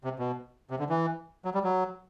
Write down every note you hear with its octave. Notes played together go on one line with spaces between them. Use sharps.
C3
B2
C3
D3
E3
F#3
G3
F#3